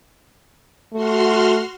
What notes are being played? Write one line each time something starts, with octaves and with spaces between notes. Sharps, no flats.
A3 F#4 C6 F6